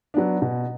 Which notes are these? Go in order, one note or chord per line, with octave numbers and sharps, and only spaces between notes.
F#3 B3 D4
B2